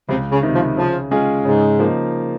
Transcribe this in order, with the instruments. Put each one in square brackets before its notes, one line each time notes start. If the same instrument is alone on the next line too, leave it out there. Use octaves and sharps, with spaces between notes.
[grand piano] C#2 [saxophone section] C3
[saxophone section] C#3
[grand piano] C3 D#3
[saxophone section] F3
[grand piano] C#3 [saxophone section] F3
[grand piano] G#3 C#4 F4 G#4
[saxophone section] G#2 [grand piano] C#3
[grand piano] F3 A#3 D#4